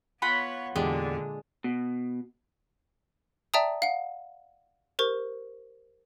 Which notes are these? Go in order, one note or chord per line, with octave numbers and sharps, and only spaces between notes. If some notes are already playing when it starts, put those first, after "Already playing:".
B3 F4 C#5 F#5 B5
E2 A#2 D3 G#3 D4 G4
B2
D5 E5 G5 A5 A#5 D#6
F5 F#5
G4 A#4 C5 C#6